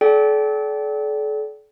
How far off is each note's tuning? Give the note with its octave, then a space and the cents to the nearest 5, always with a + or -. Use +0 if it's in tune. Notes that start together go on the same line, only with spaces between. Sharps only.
A4 -40 D5 -25 G5 -25